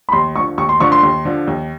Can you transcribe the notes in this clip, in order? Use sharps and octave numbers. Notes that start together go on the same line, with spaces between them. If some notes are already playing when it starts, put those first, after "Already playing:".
B5
D#2 C6
D3 F3 C#6
D#2 C#6
C6
D3 F3 C#6
C6
D#2
D3 F3
D#2